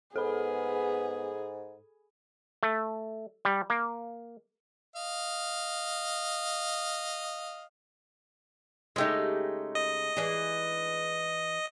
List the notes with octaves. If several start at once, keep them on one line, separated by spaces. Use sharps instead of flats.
G#2 B3 G#4 A4 B5
A3
G3
A#3
D#5 F5
C#3 G#3 A3 D#4 G4
D#5
E3 D4 G#4